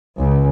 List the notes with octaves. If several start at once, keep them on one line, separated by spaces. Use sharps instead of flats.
C#2